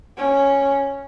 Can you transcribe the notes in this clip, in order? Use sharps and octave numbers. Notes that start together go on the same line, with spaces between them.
C#4